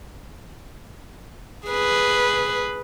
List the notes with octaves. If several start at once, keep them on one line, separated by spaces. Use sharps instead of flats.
G#4 B4